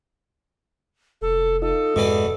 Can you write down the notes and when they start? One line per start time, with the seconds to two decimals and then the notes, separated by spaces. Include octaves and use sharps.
1.22 F1 A4
1.62 D#4 F4 A4 D#5
1.96 F2 G#2 B2 E3 G#3 D5 D#5